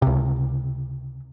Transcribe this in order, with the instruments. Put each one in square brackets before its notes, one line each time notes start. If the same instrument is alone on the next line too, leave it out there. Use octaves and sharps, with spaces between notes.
[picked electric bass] C#2 C3